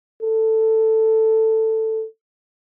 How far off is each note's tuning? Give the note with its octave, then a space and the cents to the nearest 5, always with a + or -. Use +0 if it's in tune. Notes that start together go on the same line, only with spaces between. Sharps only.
A4 +10